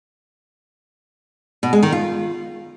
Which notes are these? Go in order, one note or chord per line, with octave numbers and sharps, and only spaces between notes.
B2
G#3
D#3
F4